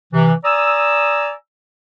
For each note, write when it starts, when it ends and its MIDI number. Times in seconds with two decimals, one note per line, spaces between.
0.13 0.32 48
0.13 0.32 52
0.45 1.32 74
0.45 1.32 80
0.45 1.32 82
0.45 1.32 87
0.45 1.32 88